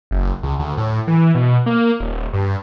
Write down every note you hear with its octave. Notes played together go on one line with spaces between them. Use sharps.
F#1
C#2
D2
A2
E3
B2
A#3
D#1
G2